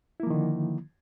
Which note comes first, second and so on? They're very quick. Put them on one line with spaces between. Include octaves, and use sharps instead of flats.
E4 A#3 F3 D#3 D3